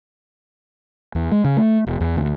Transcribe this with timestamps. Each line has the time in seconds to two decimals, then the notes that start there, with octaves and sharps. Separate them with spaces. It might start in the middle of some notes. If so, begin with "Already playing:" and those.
1.15 E2
1.32 G#3
1.44 C#3
1.57 A3
1.87 E1
2.01 E2
2.17 D2